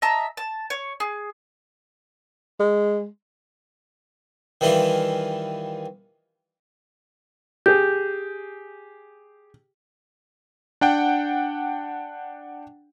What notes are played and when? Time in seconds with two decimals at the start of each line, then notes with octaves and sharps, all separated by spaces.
0.02 D#5 E5 A5 A#5
0.37 A5
0.70 C#5
1.00 G#4
2.60 G#3
4.61 D#3 E3 G3 E4 F4
7.66 G4 G#4 G6
10.81 D4 F#5 G5